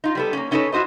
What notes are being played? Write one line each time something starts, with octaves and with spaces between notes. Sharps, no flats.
D#4 F4
G3 B3 A4
A#3 C#4
B3 C#4 D#4 A4 B4 C#5
E4 F#4 C5 D#5